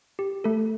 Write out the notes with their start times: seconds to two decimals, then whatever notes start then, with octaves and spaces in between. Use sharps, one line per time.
0.19 G4
0.44 A3 A4